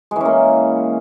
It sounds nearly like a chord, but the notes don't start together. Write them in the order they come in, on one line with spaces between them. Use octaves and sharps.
G#3 E3 C#4 A#3